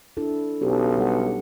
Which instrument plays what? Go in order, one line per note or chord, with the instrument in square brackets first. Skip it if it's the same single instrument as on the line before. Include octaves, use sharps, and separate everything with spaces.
[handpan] D4 E4 A4
[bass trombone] B1 [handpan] C#4 G4 A4
[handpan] G3 F#5